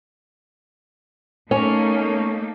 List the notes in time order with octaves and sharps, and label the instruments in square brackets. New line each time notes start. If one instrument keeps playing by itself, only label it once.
[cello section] A3 A#3 D#4 [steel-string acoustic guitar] C#4